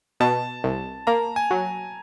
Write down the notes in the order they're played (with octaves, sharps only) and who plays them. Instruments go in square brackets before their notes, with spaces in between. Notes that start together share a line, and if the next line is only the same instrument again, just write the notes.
[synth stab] B2 [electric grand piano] A5
[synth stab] C2
[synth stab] A#3 [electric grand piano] A#5
[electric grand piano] G#5
[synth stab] F#3